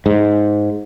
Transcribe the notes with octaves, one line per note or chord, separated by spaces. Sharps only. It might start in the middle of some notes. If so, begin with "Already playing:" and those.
G#2